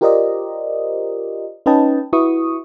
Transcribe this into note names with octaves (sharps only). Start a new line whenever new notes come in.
F4 G4 A#4 C5 D5 D#5
C#4 D#4 B4 D#5 G5 A5
E4 F#4 B4 C#6 D#6